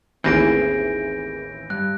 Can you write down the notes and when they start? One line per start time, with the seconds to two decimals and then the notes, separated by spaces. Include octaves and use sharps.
0.24 A1 D#2 E3 C4 G#4 G6 A#6 D7
1.70 G2 F#6